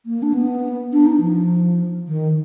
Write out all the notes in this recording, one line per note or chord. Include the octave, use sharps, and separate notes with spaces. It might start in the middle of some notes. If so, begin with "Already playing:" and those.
A#3
D4
B3
D4
D#4
F3
D#3